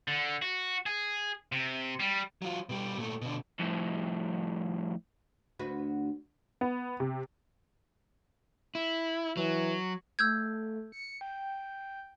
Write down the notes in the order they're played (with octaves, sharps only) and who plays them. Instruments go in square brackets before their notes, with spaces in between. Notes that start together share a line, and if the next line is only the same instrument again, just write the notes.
[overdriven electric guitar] D3
F#4
G#4
C3
G3
[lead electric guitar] F#3 F4
B2 G3
A#2 A3
B2 D3
[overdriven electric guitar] F2 A2
[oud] D2 F#4 B4
[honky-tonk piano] B3
C3
[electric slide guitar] E4
[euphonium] E3 [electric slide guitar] F#3
[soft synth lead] A3 [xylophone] E6 G6 G#6
[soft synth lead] C#7
G5